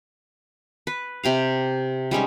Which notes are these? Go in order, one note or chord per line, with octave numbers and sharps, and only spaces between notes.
B4
C3 G4 F5
G3 G#3 C#4 D#4